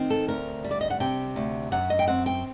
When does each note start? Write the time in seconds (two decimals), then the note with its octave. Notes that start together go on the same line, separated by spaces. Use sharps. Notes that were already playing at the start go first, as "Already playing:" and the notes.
Already playing: D#3 C4
0.10 A4
0.28 D2 A#4
0.64 G3
0.71 D5
0.81 D#5
0.90 F#5
1.00 C3 G5
1.36 D2
1.72 F#2 F#5
1.90 D#5
1.99 G5
2.08 C4 F#5
2.26 G5